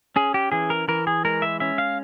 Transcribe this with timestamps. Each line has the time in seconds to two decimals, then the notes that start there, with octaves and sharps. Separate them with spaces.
0.16 C#4 G#4
0.34 G4
0.52 E3 G#4
0.70 A#4
0.88 E3 A#4
1.07 G#4
1.25 G#3 A#4
1.42 E5
1.60 C#4 E5
1.78 F5